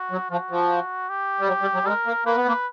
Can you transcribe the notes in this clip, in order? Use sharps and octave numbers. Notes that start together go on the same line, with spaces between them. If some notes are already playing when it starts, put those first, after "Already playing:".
Already playing: F#4
F#3
F3 F#4
F3
G4
G3
F#3
G3
F#3
G3
G#3 A#4
A#3
A#3 B4
B3
A#3